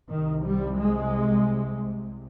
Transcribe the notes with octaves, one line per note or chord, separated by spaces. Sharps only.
C2 C3 D#3
G3
G#3